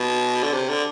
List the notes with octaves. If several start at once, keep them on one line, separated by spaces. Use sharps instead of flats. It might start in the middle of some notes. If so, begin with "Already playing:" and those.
Already playing: B2
D3
C3
D3